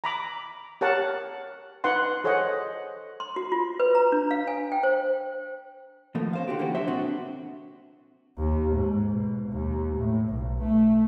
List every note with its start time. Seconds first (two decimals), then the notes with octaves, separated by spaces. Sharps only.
0.04 A#5 B5 D6
0.81 G4 A#4 C#5 F#5 A5
1.84 D#4 B4 F#5 C6
2.24 G#4 A4 C5 C#5 D#5 F#5
3.20 C6
3.36 F#4
3.52 F4
3.80 B4
3.95 A#5
4.12 D4
4.31 F5
4.47 G#5
4.72 G5
4.83 C5
6.15 D#2 B2 F3 A3 A#3
6.33 C#4 C5 F5
6.48 D3 F#4 G4
6.59 D3 E3 A#3 C#4 F#4 G4
6.75 C2 F#3 C5 C#5 E5
6.87 A#2 B3 C4 D4 F#4
8.39 D#2
8.75 G#2
9.10 B2
9.50 D#2
9.97 A2
10.29 B1
10.62 A3